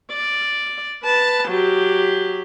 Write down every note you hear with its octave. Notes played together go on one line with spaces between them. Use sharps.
D5
B4 A5
F#3 G4